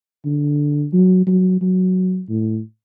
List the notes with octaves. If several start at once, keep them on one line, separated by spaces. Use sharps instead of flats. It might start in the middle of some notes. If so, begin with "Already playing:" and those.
D3
F#3
F#3
F#3
A2